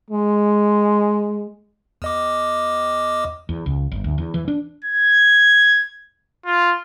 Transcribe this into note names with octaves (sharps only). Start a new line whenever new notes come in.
G#3
E2 D#5 D6
E2
C#2
G1
D2
E2
E3
D4
G#6
F4